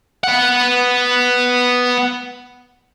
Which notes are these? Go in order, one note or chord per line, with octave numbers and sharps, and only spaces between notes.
B3 F#5